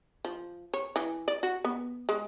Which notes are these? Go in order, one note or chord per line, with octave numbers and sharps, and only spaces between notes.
F3
C#5
E3
D5
F#4
B3
G#3